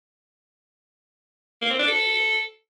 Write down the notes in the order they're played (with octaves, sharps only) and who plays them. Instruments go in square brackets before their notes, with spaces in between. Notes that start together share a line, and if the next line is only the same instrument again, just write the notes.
[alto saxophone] A#3
C4
D4
A4